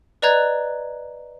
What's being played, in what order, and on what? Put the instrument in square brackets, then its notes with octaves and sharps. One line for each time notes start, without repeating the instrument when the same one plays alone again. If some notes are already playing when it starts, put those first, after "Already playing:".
[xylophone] B4 D5 D#5 A#5 F#6 G#6